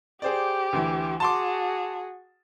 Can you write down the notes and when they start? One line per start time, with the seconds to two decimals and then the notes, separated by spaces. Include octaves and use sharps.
0.22 G4 G#4 C5 D5
0.73 D2 E3
1.20 F#4 G#4 A5 C6 D6